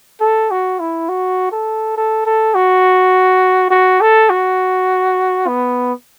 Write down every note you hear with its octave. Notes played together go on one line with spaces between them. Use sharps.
A4
F#4
E4
F#4
A4
A4
A4
F#4
F#4
A4
F#4
B3